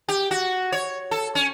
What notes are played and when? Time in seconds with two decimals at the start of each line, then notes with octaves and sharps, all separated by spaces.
0.09 G4
0.31 F#4
0.72 C#5
1.11 A4
1.35 C#4